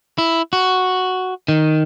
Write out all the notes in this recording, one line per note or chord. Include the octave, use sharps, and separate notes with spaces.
E4
F#4
D#3